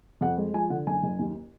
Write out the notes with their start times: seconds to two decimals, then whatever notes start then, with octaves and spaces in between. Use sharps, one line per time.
0.21 F2 F#5
0.37 G#3
0.53 F3 G#5
0.70 D3 F#5
0.87 F#1 G#5
1.03 F#1
1.19 D#2